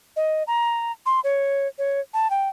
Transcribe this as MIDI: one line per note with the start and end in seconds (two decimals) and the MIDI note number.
0.16 0.43 75
0.47 0.92 82
1.06 1.20 84
1.24 1.68 73
1.78 2.00 73
2.14 2.30 81
2.30 2.49 79